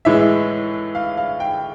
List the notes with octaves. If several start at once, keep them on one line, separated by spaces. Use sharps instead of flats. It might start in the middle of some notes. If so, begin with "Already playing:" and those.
A2 E3 G#3 E5
F5
F5
G5